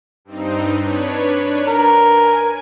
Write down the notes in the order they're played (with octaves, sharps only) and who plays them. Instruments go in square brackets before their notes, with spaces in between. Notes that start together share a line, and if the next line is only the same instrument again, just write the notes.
[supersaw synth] G2 C4 D#4
D4 B4 C#5
[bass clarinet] A#4
[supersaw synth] G#5